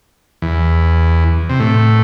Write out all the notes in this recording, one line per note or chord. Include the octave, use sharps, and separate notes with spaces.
E2
C3
A2